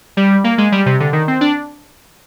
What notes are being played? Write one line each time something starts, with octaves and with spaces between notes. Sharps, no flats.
G3
A#3
G#3
G3
C3
D3
D#3
C4
D4